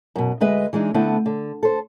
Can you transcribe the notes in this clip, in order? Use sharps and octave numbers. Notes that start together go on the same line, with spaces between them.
F#2 B2
D2 G#3 B4 D#5 E5
E3 G#3 D4 D#4
D3 A3 B3 C4 E4
D3
A4 C5